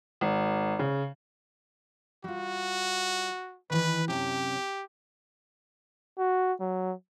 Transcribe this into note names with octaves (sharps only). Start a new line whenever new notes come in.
G#1
C#3
G3 F4 F#4
D#3 E3 B4
F#2 C3 C#4 G4
F#4
F#3